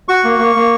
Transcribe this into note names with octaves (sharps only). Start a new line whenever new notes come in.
F#4 C#6
A#3
A#3
A#3